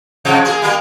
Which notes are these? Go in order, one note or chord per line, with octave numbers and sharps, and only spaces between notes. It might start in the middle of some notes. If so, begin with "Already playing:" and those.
C3 F3 G#3
A#3 G#4
G3 A#3 A#4